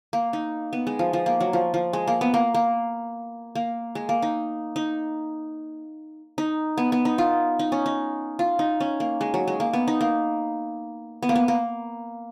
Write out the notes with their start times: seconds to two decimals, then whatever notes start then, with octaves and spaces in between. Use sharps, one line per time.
0.13 A#3
0.33 D#4
0.73 B3
0.87 G#3
0.99 F3
1.13 F3
1.26 A#3
1.40 F#3
1.53 F3
1.74 F3
1.93 G#3
2.08 A#3
2.21 B3
2.34 A#3
2.54 A#3
3.55 A#3
3.95 G#3
4.09 A#3
4.22 D#4
4.76 D#4
6.38 D#4
6.78 B3
6.92 B3
7.05 D#4
7.18 F4
7.59 D#4
7.72 C#4
7.86 D#4
8.39 F4
8.59 D#4
8.80 C#4
9.00 A#3
9.21 G#3
9.34 F#3
9.48 G#3
9.60 A#3
9.73 B3
9.88 D#4
10.01 A#3
11.23 B3
11.29 A#3
11.36 B3
11.48 A#3